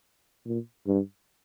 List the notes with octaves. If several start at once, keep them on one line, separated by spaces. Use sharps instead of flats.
A#2
G2